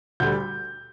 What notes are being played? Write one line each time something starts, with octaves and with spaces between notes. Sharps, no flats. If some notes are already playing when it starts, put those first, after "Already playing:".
D2 D3 G3 G6